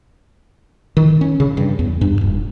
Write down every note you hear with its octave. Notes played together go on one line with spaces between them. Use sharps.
D#3
C#4
C#3
G2
E2
G2
D#1